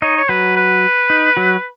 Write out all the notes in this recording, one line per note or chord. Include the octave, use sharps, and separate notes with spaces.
D#4 C#5 D#5
C#5
F#3 F#4 B4
B4
D#4
F#3 F#4